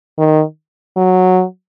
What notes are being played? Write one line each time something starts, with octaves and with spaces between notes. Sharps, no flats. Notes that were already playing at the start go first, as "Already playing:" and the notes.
D#3
F#3